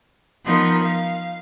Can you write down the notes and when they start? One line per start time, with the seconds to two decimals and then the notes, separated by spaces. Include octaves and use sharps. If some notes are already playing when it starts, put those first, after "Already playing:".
0.45 F3 B3 D#4 F4 A#4
0.83 F5